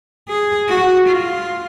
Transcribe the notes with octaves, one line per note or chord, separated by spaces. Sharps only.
G#4
F#4
F4